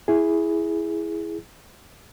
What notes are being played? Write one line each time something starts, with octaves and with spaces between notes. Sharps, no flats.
E4 G#4